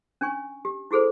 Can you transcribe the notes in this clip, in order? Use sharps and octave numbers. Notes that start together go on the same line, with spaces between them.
C#4 D4 G#5 C#6
G4
E4 F#4 G#4 A4 C5